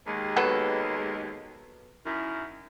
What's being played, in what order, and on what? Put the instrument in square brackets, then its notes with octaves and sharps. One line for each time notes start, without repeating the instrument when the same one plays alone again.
[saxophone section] D#2 G#3
[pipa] F#3 B3 A4
[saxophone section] F#2 D#3 E4